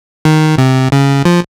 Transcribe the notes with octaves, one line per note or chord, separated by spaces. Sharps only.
D#3
C3
C#3
F3